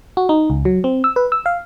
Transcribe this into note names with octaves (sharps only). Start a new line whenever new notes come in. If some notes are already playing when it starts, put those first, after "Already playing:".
F#4
D#4
C#2
F#3
C4
E6
B4
E6
F5